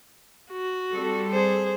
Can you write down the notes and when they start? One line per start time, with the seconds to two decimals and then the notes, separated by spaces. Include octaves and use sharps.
0.52 F#4
0.93 G3 C4 A4
1.31 G#4 C5